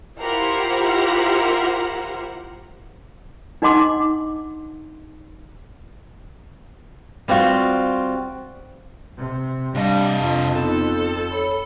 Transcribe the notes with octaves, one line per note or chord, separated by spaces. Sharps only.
E4 F4 G4 A#4 C5 F#5
D4 D#4 D#5 F#5 C6 D6
G3 C4 F4 F#4
C3
C3 G3 D4 D#5 F5 A5
F2
B3 D#4 A4
C#5 B5 E6